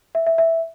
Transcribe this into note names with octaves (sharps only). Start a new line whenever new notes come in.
E5
E5
E5